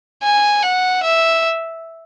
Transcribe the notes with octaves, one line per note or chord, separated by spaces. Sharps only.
G#5
F#5
E5